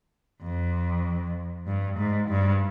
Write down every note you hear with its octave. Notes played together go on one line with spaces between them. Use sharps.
F2
G2
G#2
G2